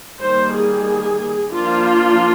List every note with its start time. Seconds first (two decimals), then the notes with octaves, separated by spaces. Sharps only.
0.21 D#3 G3 A#3 C5
0.54 G#4
1.52 F3 A#3 D4 F4